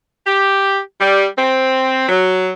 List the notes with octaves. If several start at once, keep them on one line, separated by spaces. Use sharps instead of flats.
G4
G3
C4
F#3